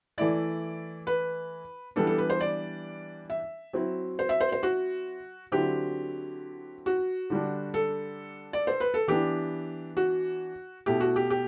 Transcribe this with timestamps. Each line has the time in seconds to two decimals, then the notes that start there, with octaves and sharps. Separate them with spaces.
0.18 E3 A3 E4 D5
1.07 B4
1.96 E3 G3 B3 D4 A4
2.07 A4
2.18 B4
2.30 C5
2.41 D5
3.30 E5
3.73 F#3 C4 E4
4.19 C5
4.29 E5
4.41 C5
4.52 C5
4.63 F#4
5.52 D3 F#3 C4 E4 G4
6.86 F#4
7.30 D3 G3 D4
7.74 A4
8.53 D5
8.67 C5
8.80 B4
8.94 A4
9.08 E3 B3 D4 G4
9.97 F#4
10.86 B2 A3 E4 G4
11.00 F#4
11.16 G4
11.30 G4